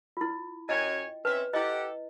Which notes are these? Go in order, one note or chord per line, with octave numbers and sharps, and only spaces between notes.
E4 F4
F#2 C#5 D#5 G5 G#5
C4 C#4 B4 E5
E4 G4 A4 D#5 F#5